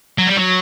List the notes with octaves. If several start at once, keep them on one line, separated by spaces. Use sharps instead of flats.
F#3
G3
F#3